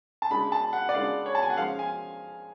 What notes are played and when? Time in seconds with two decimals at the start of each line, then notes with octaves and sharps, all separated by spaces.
0.22 A5
0.30 C#3 G#3 D4 B5
0.52 A5
0.73 F#5
0.89 D5
0.94 C#3 G#3 D4 F5
1.26 C#5
1.35 A5
1.42 G#5
1.50 F#5
1.57 F3 G#3 C#4 F5
1.79 G#5